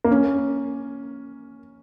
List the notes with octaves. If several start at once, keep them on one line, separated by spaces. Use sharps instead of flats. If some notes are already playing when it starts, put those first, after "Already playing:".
A#3
C#4